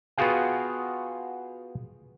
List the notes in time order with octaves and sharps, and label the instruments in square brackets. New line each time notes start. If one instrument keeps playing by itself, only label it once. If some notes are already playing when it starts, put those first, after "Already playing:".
[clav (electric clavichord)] B3 F4 F#4 G#4 F5 G5